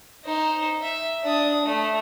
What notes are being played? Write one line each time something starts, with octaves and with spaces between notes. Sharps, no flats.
D#4 C5
E5
D4 D#6
A3